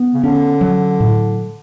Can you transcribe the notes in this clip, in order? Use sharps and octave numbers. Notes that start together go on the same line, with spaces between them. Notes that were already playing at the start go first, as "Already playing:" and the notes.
Already playing: B3
C#3
D3 C#4
F#3
A2